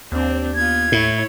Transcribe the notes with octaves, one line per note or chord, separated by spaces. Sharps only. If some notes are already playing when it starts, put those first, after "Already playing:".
D#2 C4 D4
B3 F4 G#6
A2 E4 C#5